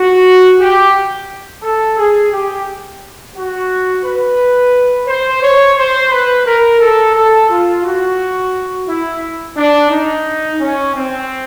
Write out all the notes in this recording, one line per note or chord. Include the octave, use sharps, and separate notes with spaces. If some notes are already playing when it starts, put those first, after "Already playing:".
Already playing: F#4
G4
A4
G#4
G4
F#4
B4
C5
C#5
C5
B4
A#4
A4
A4
F4
F#4
E4
D4
D#4
C#4
C4